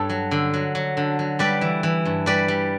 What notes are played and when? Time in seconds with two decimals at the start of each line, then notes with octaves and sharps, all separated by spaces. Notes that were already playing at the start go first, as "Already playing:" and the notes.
Already playing: G2 A4 C#5
0.10 F#3
0.31 D3
0.54 F#3
0.75 F#3
0.97 D3
1.19 F#3
1.39 G3 B4 D5
1.61 E3
1.83 E3
2.05 G2
2.26 G3 B4 D5
2.48 G3